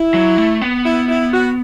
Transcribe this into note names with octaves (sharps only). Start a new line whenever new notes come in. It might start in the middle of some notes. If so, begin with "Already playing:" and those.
Already playing: E4
F#3
A3
B3
E4
E4
F#4